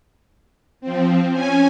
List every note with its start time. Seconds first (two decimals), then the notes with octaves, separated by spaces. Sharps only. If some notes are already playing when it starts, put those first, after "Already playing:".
0.81 F3 C4
1.33 C#4 G#5